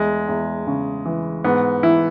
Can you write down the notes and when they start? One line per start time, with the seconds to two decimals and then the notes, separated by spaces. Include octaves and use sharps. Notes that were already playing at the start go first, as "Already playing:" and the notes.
Already playing: E2 G#3
0.28 E2
0.67 C#3
1.05 E3
1.44 G#2 B3
1.83 E3 E4